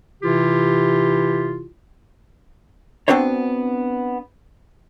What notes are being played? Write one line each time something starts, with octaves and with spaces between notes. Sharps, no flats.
C3 E3 E4 F4 G4
B3 C4 D4 F#4 C5 C#5